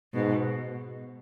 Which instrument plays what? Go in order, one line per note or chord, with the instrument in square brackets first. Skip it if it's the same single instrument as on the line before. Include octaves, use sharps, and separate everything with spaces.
[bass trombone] G#2 [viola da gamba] B2